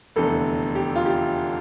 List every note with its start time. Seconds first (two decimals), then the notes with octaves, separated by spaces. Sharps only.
0.16 F1 E2 D3 A4
0.75 G4
0.96 F4
1.06 G4